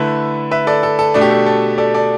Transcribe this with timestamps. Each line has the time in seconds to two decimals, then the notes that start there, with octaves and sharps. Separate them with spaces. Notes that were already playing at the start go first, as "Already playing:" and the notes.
Already playing: D3 A3 E4 B4 E5
0.51 B4 E5
0.67 A4 D5
0.83 A4
0.99 A4
1.14 B2 A3 D4
1.21 G4
1.31 A4
1.46 A4
1.78 A4 D5
1.94 A4 D5